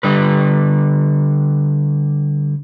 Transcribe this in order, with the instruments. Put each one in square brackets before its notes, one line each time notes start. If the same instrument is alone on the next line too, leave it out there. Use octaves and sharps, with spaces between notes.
[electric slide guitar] D3 G3 B4